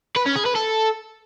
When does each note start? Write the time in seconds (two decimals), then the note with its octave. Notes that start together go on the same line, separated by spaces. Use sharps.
0.17 B4
0.26 C#4
0.36 G#4
0.46 B4
0.56 A4